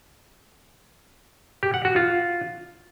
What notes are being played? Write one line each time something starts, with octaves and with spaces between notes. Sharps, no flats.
G4
F#5
F#4
F4